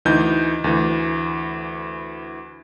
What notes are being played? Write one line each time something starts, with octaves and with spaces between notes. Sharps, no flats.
D2 E3 D#4 G6
D2 E3